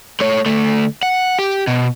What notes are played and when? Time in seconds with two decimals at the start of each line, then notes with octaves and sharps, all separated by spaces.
0.20 A3 C#5
0.46 D2 A3
1.03 F#5
1.39 G4
1.67 B2